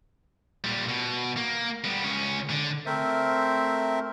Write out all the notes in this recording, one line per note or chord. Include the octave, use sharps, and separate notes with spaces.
A#2 G3
B2
A#3
G3 B3
C#2 C#4
D3
A3 C4 A#4 C5 E5